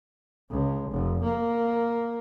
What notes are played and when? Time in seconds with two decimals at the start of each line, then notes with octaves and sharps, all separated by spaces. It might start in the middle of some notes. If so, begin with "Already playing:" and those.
0.50 C#2
0.91 F1
1.23 A#3